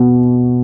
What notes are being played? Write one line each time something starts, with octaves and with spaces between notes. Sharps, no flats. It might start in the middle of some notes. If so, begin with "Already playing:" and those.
Already playing: B2